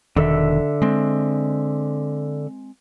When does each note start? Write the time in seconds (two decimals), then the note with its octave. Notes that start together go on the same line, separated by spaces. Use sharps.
0.16 E1 D3 D#3 A4 E5
0.82 G#3 C4